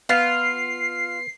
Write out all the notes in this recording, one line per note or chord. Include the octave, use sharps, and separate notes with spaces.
B3 F4 C7